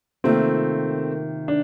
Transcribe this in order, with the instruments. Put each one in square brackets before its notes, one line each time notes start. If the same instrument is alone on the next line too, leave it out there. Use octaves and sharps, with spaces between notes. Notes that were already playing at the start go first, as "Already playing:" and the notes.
[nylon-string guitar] C3 D#3 A#3 F4 [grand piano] A3 C4
[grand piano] D4